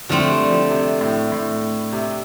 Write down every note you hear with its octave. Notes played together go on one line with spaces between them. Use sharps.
D3 F3 A3 C4
G3
F3
C3
A2
A2
C3